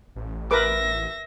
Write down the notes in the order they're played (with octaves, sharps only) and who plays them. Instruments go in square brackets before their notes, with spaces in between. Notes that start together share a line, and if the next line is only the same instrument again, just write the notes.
[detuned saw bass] A1
[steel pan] A#4 B4 D6 [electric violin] E5 A#6